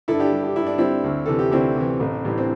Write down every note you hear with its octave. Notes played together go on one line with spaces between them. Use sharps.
G2 E4 A4
D4 G4
G3
G4
G2 E4
D4
G3 C4 E4
D2
C3 E3 A4
G4
D2 C4 E4
C3 E3
A1
A2 E3 G3
C4